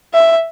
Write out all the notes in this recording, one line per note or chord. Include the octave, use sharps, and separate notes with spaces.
E5